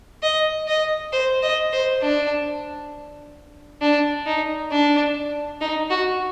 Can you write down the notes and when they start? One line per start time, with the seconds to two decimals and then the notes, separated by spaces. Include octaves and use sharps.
0.22 D#5
0.68 D#5
1.12 C5
1.42 D#5
1.72 C5
2.02 D4
3.81 D4
4.26 D#4
4.71 D4
5.61 D#4
5.90 F#4